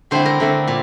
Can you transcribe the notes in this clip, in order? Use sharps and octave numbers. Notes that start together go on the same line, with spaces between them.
D3 A3 C4 E4 C5
A#4
D3 A3 C4 E4
A#2